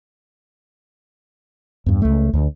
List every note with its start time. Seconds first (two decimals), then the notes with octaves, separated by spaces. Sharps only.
1.86 E2 G2
2.02 C#2 A3
2.33 D2